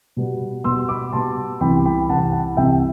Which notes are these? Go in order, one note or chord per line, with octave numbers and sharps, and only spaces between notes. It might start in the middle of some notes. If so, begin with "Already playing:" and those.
B2 G3 B3
B2 G3 B3 C6 E6
B5 D6
B2 G3 B3 A5 C6
C2 C3 E3 G5 B5
G5 B5
C2 C3 E3 F#5 A5
F#5 A5
C2 C3 E3 E5 G5